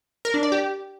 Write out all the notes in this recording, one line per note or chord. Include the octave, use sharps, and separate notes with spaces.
A#4
D4
D5
G4